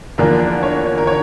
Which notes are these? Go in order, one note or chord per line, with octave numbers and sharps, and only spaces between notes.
E2 D3 F3 A#3 D4 A#4
C#5
A#4
C#5